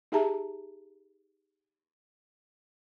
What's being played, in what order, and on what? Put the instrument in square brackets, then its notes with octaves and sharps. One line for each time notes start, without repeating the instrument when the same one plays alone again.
[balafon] D#4 G4 G#4 E5 A5 A#5